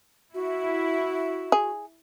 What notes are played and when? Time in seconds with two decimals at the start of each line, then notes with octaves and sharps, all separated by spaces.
0.34 E4 F#4
1.52 G#4